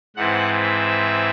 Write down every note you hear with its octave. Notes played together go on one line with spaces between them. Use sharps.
G#2 E3 C4 F#5
E5